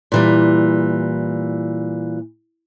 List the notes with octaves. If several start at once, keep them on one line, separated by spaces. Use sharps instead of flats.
A#2 E3 G3